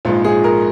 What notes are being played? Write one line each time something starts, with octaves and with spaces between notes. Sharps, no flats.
A#1 G#2 F3 F4
G#4
A#4